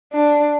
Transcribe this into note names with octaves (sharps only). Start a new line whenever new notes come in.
D4